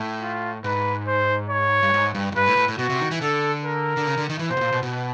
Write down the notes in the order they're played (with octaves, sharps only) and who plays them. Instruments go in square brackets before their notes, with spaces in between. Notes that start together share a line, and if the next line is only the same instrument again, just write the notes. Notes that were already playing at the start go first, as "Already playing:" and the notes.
Already playing: [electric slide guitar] A2
[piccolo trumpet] F4
[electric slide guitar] G#2 [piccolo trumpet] B4
[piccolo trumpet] C5
C#5
[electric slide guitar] G2
G#2
G2
F#2
[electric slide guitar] G2 [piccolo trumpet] B4
[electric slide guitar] A2
A2
A2
[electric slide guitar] B2 [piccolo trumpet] F#4
[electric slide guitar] C3
D#3
E3
[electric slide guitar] D3 [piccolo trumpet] A4
[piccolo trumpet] A#4
[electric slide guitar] D3
C#3
D3
D#3
E3
[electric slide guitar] A#2 [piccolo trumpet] C5
[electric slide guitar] B2
A#2
B2
B2